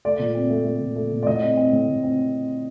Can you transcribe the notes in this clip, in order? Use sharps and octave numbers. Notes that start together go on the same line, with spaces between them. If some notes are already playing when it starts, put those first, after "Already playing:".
A3 D5
A#2
C4
A3
A3
A#2
A3
A#2
D5
A2 D#5
C4
C4
A2
A2
C4